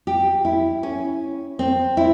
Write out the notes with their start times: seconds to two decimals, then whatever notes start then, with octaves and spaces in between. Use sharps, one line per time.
0.07 G4
0.45 E4
0.83 C#4
1.59 C4
1.97 E4